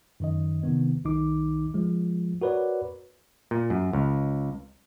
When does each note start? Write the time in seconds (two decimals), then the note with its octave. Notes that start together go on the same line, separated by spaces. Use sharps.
0.20 F#2 D#3 D#5
0.63 C3 D#3 B3
1.04 B1 D#3 D#4 D6
1.74 F3 G#3
2.41 F#4 A#4 B4 C#5 D5
3.51 A#2
3.70 F#2
3.93 C#2